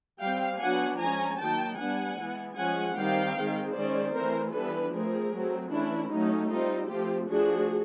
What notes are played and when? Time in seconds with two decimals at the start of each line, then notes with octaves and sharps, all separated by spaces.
0.21 G3 C4 F5 G5
0.60 F#3 B3 D4 F#5 G#5
0.99 F3 G#3 C#4 G#5 A#5
1.39 D#3 F#3 A#3 G5 A5
1.78 G3 B3 D4 F#5 G#5
2.18 E3 G#3 B3
2.57 F3 G#3 C#4 F#5 G#5
2.96 D#3 G3 C4 F5 G5
3.35 D#3 G#3 C4
3.74 D#3 G#3 C#4 C5 D5
4.14 E3 A3 C4 A#4 C5
4.53 E3 G3 B3 D4 A4 B4
4.92 F3 A3 C4 G#4 A#4
5.32 F#3 A3 C4
5.71 E3 A3 C#4 D4 E4
6.10 F#3 A3 C#4 D#4
6.50 G3 C4 D#4 F4
6.90 F3 A3 C4 F4 G4
7.28 F3 A3 D4 F#4 G#4